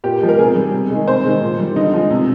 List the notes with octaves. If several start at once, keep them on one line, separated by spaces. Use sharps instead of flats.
A#2 G4
F3 G#3
A#4
C3 G#4
G3
C3
D#3 G#3
C3 C5
D#3 G#3
A#2
G3
D3 D#4
F3 G#3
C3